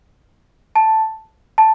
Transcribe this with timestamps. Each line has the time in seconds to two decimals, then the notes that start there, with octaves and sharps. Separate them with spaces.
0.76 A5
1.58 A5